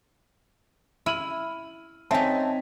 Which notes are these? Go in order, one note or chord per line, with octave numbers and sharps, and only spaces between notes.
E4 F6 D#7 F#7
C4 D#4 C#5 E5 G#5 A5